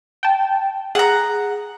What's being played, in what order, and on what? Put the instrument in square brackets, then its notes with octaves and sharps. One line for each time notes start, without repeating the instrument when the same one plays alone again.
[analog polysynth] G5 A5
[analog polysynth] G#4 [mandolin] F#5 A#5